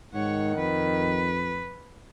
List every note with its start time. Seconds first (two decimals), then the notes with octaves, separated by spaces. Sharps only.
0.14 G#2 D#3 C#5 F#5
0.57 F2 B4